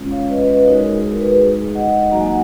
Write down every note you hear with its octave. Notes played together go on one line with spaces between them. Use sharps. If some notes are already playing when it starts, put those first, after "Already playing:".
Already playing: G#3 C#4 F4
C#5 F5
B4 D#5
B4 D#5
G#3 D#4 F#4 A#4 C#5
G#4
F#4 A#4
G#4 B4
D#5 F#5
F#3 A#3 D#4 F#4 A#5
G#5
F#5 A#5